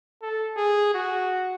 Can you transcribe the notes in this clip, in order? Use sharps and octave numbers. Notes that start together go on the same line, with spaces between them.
A4
G#4
F#4